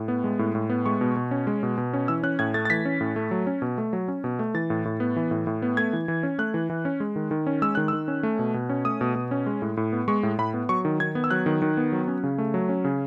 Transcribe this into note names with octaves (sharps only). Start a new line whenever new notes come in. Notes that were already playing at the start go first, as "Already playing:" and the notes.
Already playing: A2
B3
G#3
A2
A2
B3
G#3 C#6
B2
B2
C#4
G#3
B2
B2
C#4
E3 E6
C#4 F#6
A2 G#6
A3 A6
A6
E3 B6
C#4
A2
A3
F#3
C#4
B2
A3
F#3
C#4
B2
A3
E3 A6
A2
A2
B3
E3
A2
A2
B3
A3 G#6
E3
E3
C#4
A3 F#6
E3
E3
C#4
G#3
D#3
D#3
C#4
G#3 E6
D#3 F#6
D#3 E6
C#4
A3
B2
B2
C#4
A3 D#6
B2
B2
C#4
G#3
A2
A2
B3
G#3 C#6
A2
A2 B5
B3
F#3 C#6
D#3
D#3 G#6
B3
E6
F#3 F#6
D#3
D#3
B3
F#3
C#4
C#3
A3
F#3
C#4
C#3